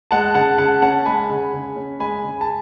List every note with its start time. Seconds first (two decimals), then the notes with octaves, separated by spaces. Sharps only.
0.11 G#3 F#5 A5
0.34 C#3 F#5 A5
0.58 C#3 F#5 A5
0.82 C#4 F#5 A5
1.06 G#3 G#5 B5
1.30 C#3
1.53 C#3
1.76 C#4
2.00 G#3 G#5 B5
2.23 C#3
2.41 A5